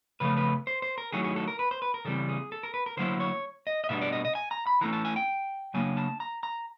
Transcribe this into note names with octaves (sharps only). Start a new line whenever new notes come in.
C#3 F3 A3 B4
B4
C5
C5
A#4
D#3 F#3 A3 C#4 E4 G#4
G#4
A4
A#4
B4
C5
B4
A#4
C#3 E3 G3 C4 A4
G#4
A4
A#4
B4
A#4
D3 F#3 A#3 C#4 E4 C5
C#5
D#5
D#5
B2 G3 B3 D4 E5
D5
D#5
D#5
G#5
A#5
B5
E3 A3 C#4 A#5
A5
G#5
G5
C#3 F#3 A#3 D4 G#5
A5
A#5
A#5